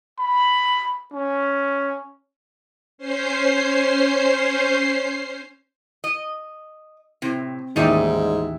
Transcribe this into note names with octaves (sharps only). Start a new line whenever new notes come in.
B5
C#4
C#4 C5 C7
D#5
A2 C3 C4
A1 D#2 G#2 D#3 D#4 D5 E5